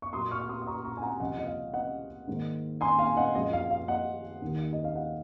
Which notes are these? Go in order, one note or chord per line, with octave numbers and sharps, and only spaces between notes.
C#6
A#2 F#3 A#3 C6 D#6
C#6 F6
F6
C6 D#6
D#6
A#5 C#6
A#5 C#6
G#5
F#5 A#5
C#2 C3 F3 D#5 F#5
D#5
F5
D#5 F#5
G#2 D#3 A#3
G#5 C6
F5 G#5
D#5 F#5
F#2 F3 G#3 D#5
F5
F5
D#5 F#5
D#2 D#3 A#3
D#5
F5
D#5 F#5